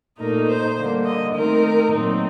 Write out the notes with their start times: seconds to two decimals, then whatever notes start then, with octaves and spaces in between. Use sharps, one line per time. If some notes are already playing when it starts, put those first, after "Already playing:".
0.19 A#2 A3 D#4 A#4
0.48 C5
0.77 D3 G3 A#3
1.06 D#5
1.34 D#3 A3 C4 D#4 A#4
1.91 A#2 F#3 A3 C4 D#4